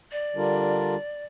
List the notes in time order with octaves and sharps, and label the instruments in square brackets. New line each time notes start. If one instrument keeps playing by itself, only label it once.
[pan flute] D5
[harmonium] D3 G3 D4 F4 A#4